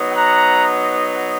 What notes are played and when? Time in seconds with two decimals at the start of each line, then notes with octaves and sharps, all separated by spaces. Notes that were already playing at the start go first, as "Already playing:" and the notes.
Already playing: F#3 B3 D#4
0.12 F#5 A#5